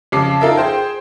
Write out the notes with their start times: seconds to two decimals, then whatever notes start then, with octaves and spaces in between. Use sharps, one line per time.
0.12 F2 C#3 D6 C7
0.41 D#4 F4 A4 A#4 E5
0.57 G#4 C5 G5